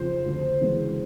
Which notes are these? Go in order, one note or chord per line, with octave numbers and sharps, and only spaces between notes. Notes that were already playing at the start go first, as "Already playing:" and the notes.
Already playing: F2 C#3 F3 C5
D2
C#3 E3 G#3 B3